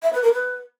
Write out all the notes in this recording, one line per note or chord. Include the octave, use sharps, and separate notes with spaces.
E5
B4
A#4
B4